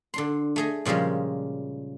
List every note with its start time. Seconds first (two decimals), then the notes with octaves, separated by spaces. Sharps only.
0.14 D3 D4 C6
0.56 A3 G#4 D#5
0.85 A#2 C#3 F3 G3 G#3